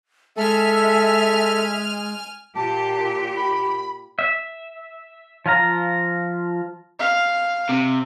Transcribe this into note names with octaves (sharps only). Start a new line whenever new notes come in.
G#3 A4 E5 G#5 F6
A#2 G4 A5
B5
E5
F3 F4 F5 A#5
F5
C3